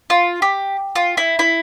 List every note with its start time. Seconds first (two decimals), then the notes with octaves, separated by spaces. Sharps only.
0.10 F4
0.42 G4
0.96 F4
1.17 E4
1.39 E4